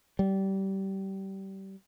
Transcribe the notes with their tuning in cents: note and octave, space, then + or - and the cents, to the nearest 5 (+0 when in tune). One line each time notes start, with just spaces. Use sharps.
G3 -25